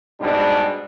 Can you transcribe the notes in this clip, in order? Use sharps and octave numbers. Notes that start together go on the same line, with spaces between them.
G#2 B2 G3 G#3 D4